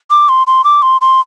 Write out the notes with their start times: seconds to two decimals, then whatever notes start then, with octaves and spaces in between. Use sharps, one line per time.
0.10 D6
0.29 C6
0.47 C6
0.64 D6
0.82 C6
1.01 C6